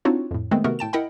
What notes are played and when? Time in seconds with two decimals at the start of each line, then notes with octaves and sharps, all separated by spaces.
0.05 C4 D4 D#4 F4 F#4 C#5
0.31 F2 A2
0.51 D#3 G#3 A3 B3 C4
0.64 C3 D#3 A3 B3 F#4 A#4
0.79 A2 G5 A5 E7
0.93 E4 A#4 D#5 F#5 G5 B5